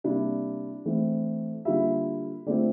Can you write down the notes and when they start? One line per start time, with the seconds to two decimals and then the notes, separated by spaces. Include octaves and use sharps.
0.04 C3 G3 A#3 D4 E4 D5
0.85 E3 A3 C4
1.65 D3 G3 A#3 E4 F4 E5
2.46 D3 A3 C4 D4 F4 D5